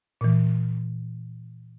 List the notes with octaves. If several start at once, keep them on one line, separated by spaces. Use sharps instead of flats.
A#2 E3